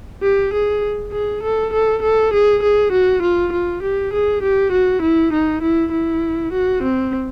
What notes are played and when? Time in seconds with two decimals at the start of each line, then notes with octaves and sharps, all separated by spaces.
0.23 G4
0.54 G#4
1.12 G#4
1.43 A4
1.74 A4
2.02 A4
2.33 G#4
2.63 G#4
2.92 F#4
3.23 F4
3.53 F4
3.83 G4
4.13 G#4
4.43 G4
4.72 F#4
5.02 E4
5.33 D#4
5.63 E4
5.92 E4
6.53 F#4
6.83 C4